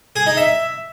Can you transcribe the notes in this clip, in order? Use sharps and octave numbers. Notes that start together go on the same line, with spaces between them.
G#4
D#4
E5